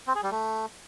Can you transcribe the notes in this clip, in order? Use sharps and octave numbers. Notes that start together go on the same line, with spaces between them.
C4
G#4
G3
A3